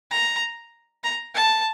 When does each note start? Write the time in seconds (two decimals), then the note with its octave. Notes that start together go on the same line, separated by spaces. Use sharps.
0.11 A#5
1.03 A#5
1.35 A5